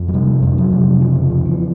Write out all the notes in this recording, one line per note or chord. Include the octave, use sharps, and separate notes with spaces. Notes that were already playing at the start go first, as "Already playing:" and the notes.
Already playing: F2
F#3
C3 G3
F2
F#3
C3
C#3 F3
F2
E3